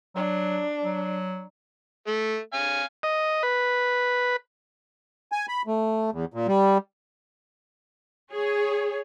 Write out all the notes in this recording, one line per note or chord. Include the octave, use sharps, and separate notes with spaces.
F#3 D4
F#3
A3
F5 G#5
D#5
B4
G#5
B5
A3
E2
A#2
G3
G#4 C#5